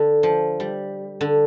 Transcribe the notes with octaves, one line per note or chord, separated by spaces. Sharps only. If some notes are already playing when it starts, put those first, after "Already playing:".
Already playing: D3
F3
G3
D3